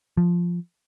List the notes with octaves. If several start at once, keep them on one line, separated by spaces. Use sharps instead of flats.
F3